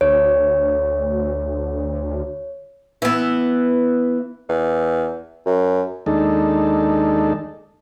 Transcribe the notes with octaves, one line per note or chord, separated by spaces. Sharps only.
D2 C#5
E3 B3
E2
F#2
D#2 G#3 D4 D#4 A4